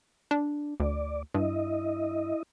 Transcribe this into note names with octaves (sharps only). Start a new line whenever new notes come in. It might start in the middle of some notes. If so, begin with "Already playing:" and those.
D4
D2 D5
G2 E4 D#5